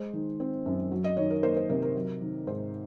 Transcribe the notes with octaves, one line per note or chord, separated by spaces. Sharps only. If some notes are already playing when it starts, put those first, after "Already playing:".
Already playing: G#3 C5
D#3
C4
F#2
F#3
D#5
D#3 C#5
A#4
A#3 C5
C5
C3 A#4
A#4
F#3
D#3
G#2 C5